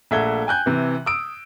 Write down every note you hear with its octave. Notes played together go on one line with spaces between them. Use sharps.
A#1 A3 E5 F#5 G#6 G7
G5 G#5 F#6 G6
C3 E3
D#6 E6 D7